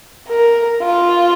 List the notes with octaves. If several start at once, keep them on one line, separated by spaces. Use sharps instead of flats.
A#4
F4